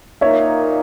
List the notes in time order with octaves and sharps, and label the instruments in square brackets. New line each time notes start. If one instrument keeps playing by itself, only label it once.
[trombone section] A#2 A#3 D#4 [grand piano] C#5 E5